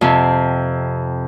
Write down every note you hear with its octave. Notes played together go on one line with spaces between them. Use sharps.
F2 C3